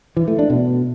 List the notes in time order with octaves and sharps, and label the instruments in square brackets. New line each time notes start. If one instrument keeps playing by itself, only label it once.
[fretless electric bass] E3
A3
D4
B2